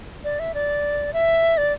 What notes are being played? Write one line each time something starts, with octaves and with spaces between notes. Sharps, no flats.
D5
E5
D5
E5
D5